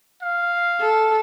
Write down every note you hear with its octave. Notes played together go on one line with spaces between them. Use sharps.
F5
A4